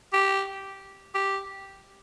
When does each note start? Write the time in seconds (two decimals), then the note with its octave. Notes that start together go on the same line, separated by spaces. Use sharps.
0.13 G4
1.14 G4